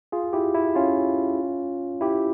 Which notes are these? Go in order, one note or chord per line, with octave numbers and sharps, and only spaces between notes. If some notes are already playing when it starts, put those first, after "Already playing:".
F4 G#4
E4 G4
E4
C#4 F4
E4 G4